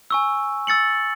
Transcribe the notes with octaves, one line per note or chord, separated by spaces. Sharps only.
G#5 C#6 E6
E6 A6 C#7 F#7